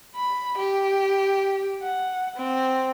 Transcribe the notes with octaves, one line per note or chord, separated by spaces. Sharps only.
B5
G4
F#5
C4